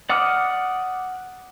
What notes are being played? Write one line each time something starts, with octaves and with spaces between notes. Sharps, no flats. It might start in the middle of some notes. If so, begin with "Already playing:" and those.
D5 F#5 D6 D#6 F6